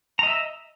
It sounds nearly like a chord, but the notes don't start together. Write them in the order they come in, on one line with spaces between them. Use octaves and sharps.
A#5 D#5 E5